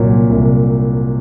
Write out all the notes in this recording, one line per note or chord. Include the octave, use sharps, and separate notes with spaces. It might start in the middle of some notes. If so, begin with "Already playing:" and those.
Already playing: C2 A#2 F#3
C2